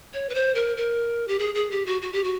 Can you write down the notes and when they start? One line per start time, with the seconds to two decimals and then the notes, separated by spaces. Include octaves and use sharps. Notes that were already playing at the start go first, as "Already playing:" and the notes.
0.14 C#5
0.29 B4
0.35 C5
0.55 A#4
0.77 A#4
1.28 G4
1.39 G#4
1.55 G#4
1.71 G4
1.86 F#4
2.02 F#4
2.13 G4
2.24 F#4